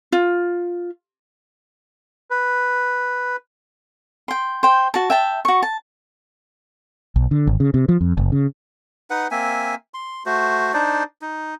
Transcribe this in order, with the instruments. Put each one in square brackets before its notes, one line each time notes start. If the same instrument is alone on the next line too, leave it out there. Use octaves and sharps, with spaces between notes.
[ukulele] F4
[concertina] B4
[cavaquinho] G5 C6
C5 G5
F#4 A5
E5 G5 A5
F#4 C#6
A5
[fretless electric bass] B1
D3
G#1
C#3
C3
F3
F2
F#1
C#3
[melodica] D#4 B4 F#5
A#3 C4 E5 G#5
C6
A3 F#4 C5
D4 D#4 C5 D5
D#4